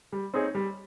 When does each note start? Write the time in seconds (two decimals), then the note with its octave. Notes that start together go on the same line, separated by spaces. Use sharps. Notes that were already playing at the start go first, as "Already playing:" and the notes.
0.12 G3
0.34 C4 D#4 G#4 C#5
0.55 G3